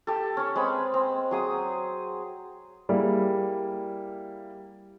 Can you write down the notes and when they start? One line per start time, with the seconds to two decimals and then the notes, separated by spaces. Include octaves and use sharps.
0.07 G4 A4
0.37 C#4 C#5
0.56 G#3 C4 B4 B5
0.94 C4
1.31 F#3 G#4 D#6
2.89 G3 A#3 E4 G#4 D5